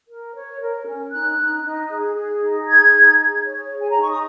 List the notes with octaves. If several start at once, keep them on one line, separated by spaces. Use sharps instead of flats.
A#4
C#5
A#4
C#4
D#4 F#6
D#4
D#4
G#4
G#4
D#4
G#4 G#6
D#4
G#4
C#5
G#4
G#5
A#5
D#4
C#6
D#6